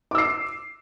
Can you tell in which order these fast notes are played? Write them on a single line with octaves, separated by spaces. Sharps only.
D6 E6 C7